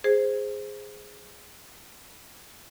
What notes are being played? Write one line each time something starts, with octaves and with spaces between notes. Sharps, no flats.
G#4 C5